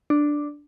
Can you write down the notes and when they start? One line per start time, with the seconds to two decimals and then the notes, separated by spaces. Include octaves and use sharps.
0.10 D4